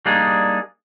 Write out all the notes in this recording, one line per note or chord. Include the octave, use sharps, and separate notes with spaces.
G3 A#3 D4 D#4 G#4